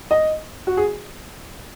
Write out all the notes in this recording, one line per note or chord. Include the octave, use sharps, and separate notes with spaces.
D#5
F#4
G#4